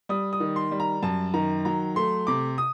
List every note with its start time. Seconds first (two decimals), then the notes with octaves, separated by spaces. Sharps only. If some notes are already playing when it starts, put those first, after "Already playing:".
0.09 G3 D#6
0.33 D#6
0.40 D#3
0.56 C6
0.71 G3
0.80 A#5
1.03 F#2 A5
1.34 D#3 A#5
1.65 F#3 A#5
1.96 A3 C6
2.27 C3 D6
2.58 D#6